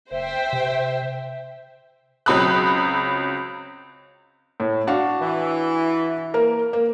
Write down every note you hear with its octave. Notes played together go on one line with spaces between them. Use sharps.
F#1 C5 E5 G5
C3
C#2 F#3 C4 B5 D#6 F#6
A2
D4 F#4 F5
E3
A#3 A#4
A#3